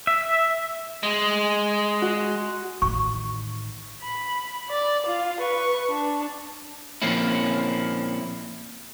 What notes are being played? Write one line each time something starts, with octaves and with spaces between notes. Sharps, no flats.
E5
G#3
F#4
A1 D#3 C#6
B5
D5
F4
B4 C#6
D4
A#2 F3 A#3 C4 C#4 E4